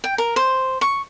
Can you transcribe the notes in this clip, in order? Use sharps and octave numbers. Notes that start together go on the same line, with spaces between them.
G5
A#4
C5
C#6